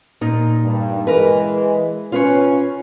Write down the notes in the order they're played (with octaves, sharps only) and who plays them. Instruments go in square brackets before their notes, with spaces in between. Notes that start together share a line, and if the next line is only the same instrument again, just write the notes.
[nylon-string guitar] A#2 D#4
[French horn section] G2
[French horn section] E3 G#3 [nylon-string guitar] A#4 B4
[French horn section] C#4 [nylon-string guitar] F4 B4 C#5